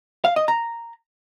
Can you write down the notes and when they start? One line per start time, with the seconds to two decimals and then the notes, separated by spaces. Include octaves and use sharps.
0.25 F5
0.36 D#5
0.48 A#5